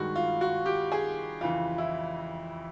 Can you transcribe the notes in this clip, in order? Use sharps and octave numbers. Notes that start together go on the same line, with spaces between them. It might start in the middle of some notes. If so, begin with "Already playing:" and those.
Already playing: G2 D#3 G#3 F#4
F4
F#4
G4
G#4
F2 C#3 E3 F4
E4